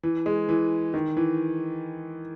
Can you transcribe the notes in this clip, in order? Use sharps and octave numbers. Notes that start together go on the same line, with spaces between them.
E3
G#3
E3
D#3
E3